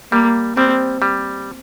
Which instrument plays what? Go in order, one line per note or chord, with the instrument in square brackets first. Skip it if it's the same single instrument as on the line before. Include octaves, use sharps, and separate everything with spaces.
[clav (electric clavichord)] G3 [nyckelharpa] A#3
[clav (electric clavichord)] G3 [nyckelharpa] C4
[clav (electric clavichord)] G3